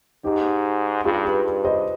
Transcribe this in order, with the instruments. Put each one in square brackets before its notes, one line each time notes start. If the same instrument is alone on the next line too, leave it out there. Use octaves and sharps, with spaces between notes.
[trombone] G#2 [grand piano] D#4 G4
[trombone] G2 [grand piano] F4 G#4
[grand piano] G4 B4
[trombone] G2
[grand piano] C5 D#5